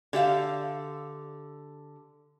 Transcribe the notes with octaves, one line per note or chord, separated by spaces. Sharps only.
D3 G4 E5 F5